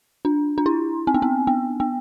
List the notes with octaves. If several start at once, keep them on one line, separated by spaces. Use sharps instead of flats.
D4
D4
E4
C4
B3
C4
B3
B3